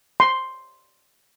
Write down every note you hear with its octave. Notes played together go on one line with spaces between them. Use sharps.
C6